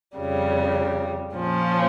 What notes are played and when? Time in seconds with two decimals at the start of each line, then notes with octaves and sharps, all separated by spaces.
0.17 F2 C#3 G3
1.33 A#2 F3 C#4